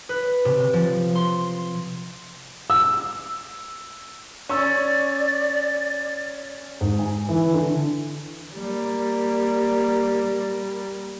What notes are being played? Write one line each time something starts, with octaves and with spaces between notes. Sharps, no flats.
B4
C3
F3
C6
E6
C#4 D5 C#6 E6
G#2
G#5
E3
D3
G3 A#3